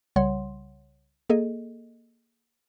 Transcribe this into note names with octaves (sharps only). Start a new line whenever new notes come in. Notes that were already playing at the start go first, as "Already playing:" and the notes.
C2 C#3 G3 C#5 F#5 C6
A#3 G#4 A4 D#5